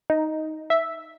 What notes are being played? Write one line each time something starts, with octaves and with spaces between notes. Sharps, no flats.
D#4
E5